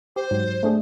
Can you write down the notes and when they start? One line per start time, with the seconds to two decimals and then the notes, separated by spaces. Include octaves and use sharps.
0.16 G4 C5
0.31 G#2 F#3
0.63 A3 D4 G#4